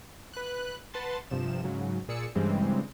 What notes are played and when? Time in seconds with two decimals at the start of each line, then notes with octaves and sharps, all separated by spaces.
0.34 B4 F#6
0.94 B4 F#5 A5 C6 A6
1.30 G2 C3 F3 E7
1.63 G#2 C#3 F#3
2.08 A#2 G#4 D5 E6 C#7
2.35 G2 C#3 E3 G3 G#3 C4